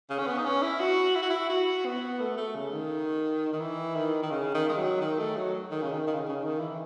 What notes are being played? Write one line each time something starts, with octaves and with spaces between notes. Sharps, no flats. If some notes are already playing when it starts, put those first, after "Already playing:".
C#3
C#4
B3
D#4
C#4
E4
F#4
E4
F#4
E4
F#4
B3
A3
A3
C#3
D#3
D#3
E3
D#3
D#3
C#3
D#3
G#3
F#3
D#3
A3
F#3
D#3
C#3
D#3
D#3
C#3
C#3
D#3
E3